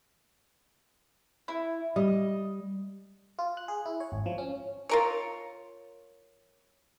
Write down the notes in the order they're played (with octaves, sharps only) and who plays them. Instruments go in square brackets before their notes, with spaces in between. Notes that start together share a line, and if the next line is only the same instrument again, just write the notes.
[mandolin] E4
[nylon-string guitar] G3 [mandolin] D#5
[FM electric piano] F4
F#6
G#4
E4
C#5
G#1
F3
C#4
[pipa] F4 A#4 C#5